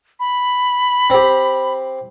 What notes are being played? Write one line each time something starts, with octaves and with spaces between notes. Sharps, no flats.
B5
C4 G4